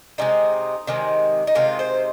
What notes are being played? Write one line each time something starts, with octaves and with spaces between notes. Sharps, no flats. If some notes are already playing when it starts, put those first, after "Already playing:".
C3 D#3 G#3 D#4
C3 D#3 G#3
D#4
C3 D#3 G#3 F4
C5